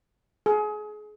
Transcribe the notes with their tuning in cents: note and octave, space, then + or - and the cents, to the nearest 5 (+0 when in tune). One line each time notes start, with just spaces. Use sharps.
G#4 +30